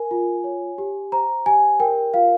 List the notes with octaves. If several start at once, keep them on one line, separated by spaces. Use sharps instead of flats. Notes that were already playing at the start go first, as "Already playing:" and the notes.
Already playing: A#4 G#5
F4
C#5
G4
C5 A#5
G4 G#5
A#4 G5
F4 F5